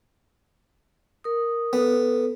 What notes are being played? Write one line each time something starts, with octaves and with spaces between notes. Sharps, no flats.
A#4 D#6
B3 A4